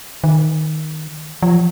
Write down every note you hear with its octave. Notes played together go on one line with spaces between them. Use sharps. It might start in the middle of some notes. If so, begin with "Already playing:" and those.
D#3
F3